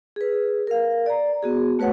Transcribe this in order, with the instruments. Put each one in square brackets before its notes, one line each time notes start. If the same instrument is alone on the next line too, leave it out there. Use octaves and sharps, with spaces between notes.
[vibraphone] G#4 B4
A#4 F5
D5 A#5
B3 F#4 G#4
A3 F#4 B4 C#5 F#5